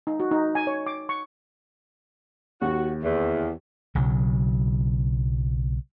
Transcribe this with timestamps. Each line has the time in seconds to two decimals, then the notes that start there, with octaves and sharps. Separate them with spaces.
0.07 D#4
0.20 F#4
0.31 D#4
0.55 G#5
0.67 C#5
0.87 D6
1.09 C#6
2.62 D#2 F#4
3.03 E2
3.95 B1 C#3 F#3